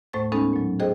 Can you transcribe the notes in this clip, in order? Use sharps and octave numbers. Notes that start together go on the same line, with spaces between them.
D#2 A2 A3 C5 C#6 A6
G#3 B3 C#4 D#4 A4
A#2 F#3
F#4 G#4 A4 C5 D#5 G5